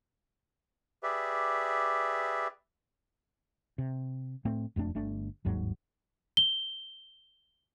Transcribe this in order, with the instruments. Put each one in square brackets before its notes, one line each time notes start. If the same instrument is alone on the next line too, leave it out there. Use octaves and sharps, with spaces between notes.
[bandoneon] G4 G#4 B4 D5 E5
[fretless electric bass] C3
A2 A3 C4
E1 F2 A3 D4
G1 A3 D4
G1 D#2 G#2 F#3
[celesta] G7